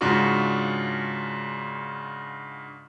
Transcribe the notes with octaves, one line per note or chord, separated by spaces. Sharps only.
G#2 C#3 D4 F4 F#4 C#6